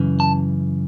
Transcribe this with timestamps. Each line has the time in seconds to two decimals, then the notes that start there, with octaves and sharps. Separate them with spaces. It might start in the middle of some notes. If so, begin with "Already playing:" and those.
Already playing: F#2 C#3 E3
0.20 A5